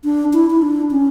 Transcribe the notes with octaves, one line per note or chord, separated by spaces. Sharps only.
D4
E4
E4
D4
C#4